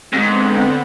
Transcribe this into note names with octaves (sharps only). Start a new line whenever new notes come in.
F2 G#2 D3 B3 C4